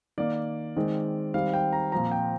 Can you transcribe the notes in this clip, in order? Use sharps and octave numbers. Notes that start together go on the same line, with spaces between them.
D#3 A#3 D5
D#3 G#3 C4
D#3 G3 C4 F5
G5
A#5
A#2 F3 C4 A#5
G5